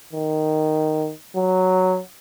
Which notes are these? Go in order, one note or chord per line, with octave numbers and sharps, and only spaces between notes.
D#3
F#3